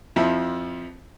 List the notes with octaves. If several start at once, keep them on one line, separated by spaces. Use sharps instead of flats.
F2 F3 E4